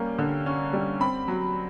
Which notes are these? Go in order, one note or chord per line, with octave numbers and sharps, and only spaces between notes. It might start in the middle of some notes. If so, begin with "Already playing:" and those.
Already playing: G3 A#3 C#4
D3
C#4
G3
C4 B5
F#3